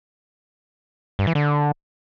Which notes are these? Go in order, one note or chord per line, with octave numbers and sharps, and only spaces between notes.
G2
E3
D3